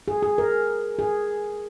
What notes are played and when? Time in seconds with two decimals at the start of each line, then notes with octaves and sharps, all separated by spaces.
0.08 G#4
0.23 G#4
0.38 A#4
0.99 G#4